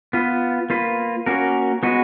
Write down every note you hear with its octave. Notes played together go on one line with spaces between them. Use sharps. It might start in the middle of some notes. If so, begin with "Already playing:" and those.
B3 F4 B4
A#3 F4 B4
A#3 C#4 F#4 A#4
G#3 B3 F#4 B4